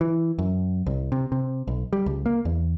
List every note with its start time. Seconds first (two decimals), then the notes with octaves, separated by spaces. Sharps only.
0.01 E3
0.38 F#2
0.86 C2
1.12 C3
1.32 C3
1.67 B1
1.93 G3
2.06 C#2
2.26 A#3
2.45 E2